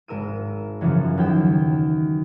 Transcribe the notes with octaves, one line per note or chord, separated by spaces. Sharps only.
G#1 A#4 E6 D#7
F#2 C#3 E3 F3
D#2 F#3 G5 E6